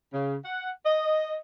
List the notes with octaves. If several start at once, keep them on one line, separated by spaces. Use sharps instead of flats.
C#3
F#5
D#5